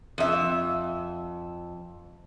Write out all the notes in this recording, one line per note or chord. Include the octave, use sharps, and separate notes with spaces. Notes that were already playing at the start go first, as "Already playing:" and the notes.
F2 E5